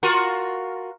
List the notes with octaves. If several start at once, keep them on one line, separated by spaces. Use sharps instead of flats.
F4 F#4 A#4